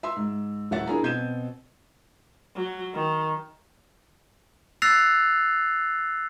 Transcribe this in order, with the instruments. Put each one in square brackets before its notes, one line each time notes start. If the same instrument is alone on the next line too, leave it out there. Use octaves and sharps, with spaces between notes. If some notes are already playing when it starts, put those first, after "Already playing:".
[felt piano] E5 C6 E6
G#2
D#1 A1 C#5 E5 F#5 A6
D4 E4 G#4 A#4 A#5
B2 C4 G6 G#6 D#7 E7
[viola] F#3
D#3
[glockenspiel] E6 F#6 A6 A#6 C7 F7